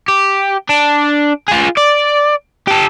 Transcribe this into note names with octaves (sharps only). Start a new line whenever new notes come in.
G4
D4
F4 G#4
D5
G4 A4